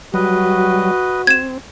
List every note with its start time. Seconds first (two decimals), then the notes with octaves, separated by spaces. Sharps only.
0.14 F#3 G3 F#4 B4 D#5
1.27 C4 G#6 E7